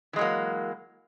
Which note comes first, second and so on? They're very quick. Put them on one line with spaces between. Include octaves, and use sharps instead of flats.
E3 G#3 F#3 A#3